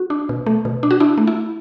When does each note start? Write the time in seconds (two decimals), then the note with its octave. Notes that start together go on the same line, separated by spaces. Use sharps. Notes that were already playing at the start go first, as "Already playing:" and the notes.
Already playing: F#4
0.10 D4
0.29 B2
0.46 A3
0.65 B2
0.83 D4
0.91 F#4
1.00 D4 E4
1.18 A3
1.27 E4